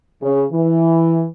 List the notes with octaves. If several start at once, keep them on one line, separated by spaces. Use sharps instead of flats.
C#3
E3